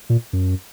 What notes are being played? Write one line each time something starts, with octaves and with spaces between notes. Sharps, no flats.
A#2
F#2